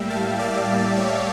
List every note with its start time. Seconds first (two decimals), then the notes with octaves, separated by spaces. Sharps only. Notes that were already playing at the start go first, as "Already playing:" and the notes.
Already playing: A2 G3 A#3 E5 G5
0.10 F5 A5
0.39 D5 F5
0.97 C#5 E5